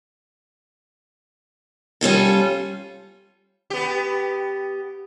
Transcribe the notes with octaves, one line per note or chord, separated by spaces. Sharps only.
G3 C#4 F4 A4
B3 G4